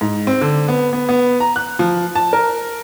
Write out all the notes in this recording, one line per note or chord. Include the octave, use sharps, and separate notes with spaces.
G#2
C4
D3
B3
B3
B3
A#5
F#6
F3
A5
A#4